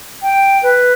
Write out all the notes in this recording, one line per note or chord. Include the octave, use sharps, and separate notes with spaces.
G5
B4